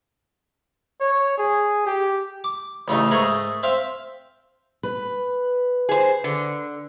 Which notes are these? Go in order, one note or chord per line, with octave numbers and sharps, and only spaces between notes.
C#5
G#4
G4
D6
A1 C#3 A3 D#4
G#2 A3 G#4 A#4 D#5 C#6
C4 E5 F5
B4
G#4 C5
D3